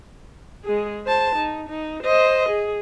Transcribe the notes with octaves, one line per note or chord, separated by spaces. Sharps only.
G#3 G#4
C5 A5
D#4
D#4
C5 D#5
G#4